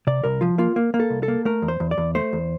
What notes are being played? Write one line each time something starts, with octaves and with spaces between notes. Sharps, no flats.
C3 D5
C2 A#4
F3 F4
A#3 F4
A#3
A#3
A4
C2
A4
A#3
A3 A#4
E2
C5
E2
D5
E2
A3 C5
E2